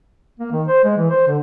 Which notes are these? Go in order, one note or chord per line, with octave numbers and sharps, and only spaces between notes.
A#3
D#3
C5
G#3
E3
C5
D3